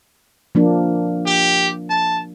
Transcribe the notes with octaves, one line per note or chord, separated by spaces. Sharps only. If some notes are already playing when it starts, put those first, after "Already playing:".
F3 A#3 D4
G4
A5